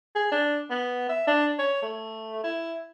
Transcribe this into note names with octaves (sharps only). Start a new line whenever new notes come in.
G#4
D4
B3
E5
D4
C#5
A3
E4